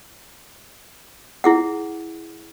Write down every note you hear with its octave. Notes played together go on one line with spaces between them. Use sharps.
E4 G#4 F#5